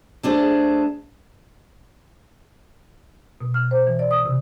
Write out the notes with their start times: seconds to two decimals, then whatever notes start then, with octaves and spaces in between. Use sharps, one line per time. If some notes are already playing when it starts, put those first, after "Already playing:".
0.23 A3 D4 G#4 C5
3.41 B2
3.54 F6
3.71 C5
3.86 E3
3.99 D5
4.11 D#6
4.25 C3